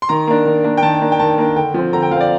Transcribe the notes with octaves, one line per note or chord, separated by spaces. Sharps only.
C6
D#3 A#5
A#3 D4
D#3
A#3 D4
G5
D#3 A5
A#3 D4
G5
D#3 A5
A#3 D4
D3 G5
F3 C4
D3 A#5
G5
F3 C4 D5 F5